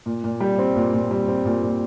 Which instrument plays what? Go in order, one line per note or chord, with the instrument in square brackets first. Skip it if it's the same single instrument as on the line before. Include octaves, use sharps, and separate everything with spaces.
[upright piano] A#2
A#2
G3
C4
A#2
A#2
G3
C4
A#2
A#2